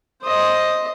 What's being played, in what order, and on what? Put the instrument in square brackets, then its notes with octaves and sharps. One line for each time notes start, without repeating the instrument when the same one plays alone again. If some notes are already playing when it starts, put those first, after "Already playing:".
[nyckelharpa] C5 D#5